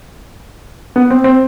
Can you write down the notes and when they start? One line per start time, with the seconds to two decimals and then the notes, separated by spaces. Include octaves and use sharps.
0.96 B3
1.10 C4
1.24 C4